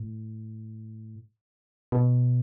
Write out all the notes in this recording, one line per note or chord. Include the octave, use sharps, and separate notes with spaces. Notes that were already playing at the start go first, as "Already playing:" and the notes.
Already playing: A2
B2